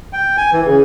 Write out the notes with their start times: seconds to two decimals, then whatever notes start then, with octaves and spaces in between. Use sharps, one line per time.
0.13 G5
0.37 G#5
0.52 E3
0.65 C#3